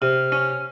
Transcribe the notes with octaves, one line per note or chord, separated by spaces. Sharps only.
C3 F6
C#4